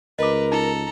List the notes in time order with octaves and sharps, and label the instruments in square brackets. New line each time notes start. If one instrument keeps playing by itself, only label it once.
[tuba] C#2 [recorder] A#4 [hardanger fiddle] B4 [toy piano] D#5 D6
[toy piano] D#4 [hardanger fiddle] A4 A#5